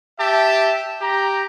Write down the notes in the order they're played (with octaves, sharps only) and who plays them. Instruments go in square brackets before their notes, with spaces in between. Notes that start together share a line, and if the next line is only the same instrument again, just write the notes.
[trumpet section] G4 E5 A5
G4 A#5